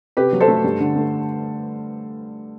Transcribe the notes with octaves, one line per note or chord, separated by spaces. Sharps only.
C3 G4 B4
F#3
A4 C5
A3
G2
D3
A3